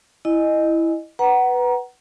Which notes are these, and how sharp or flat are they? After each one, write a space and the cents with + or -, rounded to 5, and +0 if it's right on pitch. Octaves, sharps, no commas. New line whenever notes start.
E4 +0 D#5 -15 G#5 +0
B4 +0 F#5 +20 A#5 +20